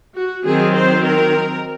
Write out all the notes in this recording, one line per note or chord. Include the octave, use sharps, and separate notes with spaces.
F#4
D#3 F#3 C4 G#4
C5
A#4